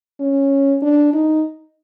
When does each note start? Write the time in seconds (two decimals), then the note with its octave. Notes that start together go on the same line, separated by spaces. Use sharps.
0.20 C#4
0.82 D4
1.14 D#4